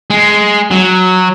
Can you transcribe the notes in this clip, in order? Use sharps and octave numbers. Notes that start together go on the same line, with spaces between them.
G#3
F#3